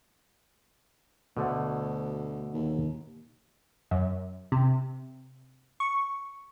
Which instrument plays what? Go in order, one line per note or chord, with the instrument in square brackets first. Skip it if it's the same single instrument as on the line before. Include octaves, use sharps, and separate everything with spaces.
[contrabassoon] D2 [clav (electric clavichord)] B2 D3 A3
[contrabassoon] D#2
[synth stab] F#2
C3
C#6